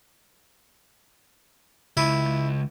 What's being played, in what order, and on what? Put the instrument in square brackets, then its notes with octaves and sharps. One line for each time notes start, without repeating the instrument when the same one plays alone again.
[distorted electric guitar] C#2 [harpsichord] E4